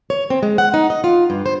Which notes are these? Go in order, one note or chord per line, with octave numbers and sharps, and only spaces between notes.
C#5
C4
G#3
F#5
D#4
D#5
F4
G2
C5